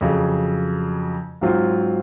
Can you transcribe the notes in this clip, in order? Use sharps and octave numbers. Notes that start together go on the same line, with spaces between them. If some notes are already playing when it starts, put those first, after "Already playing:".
F2 C#3 F#3
G#2 F#3 C4 F4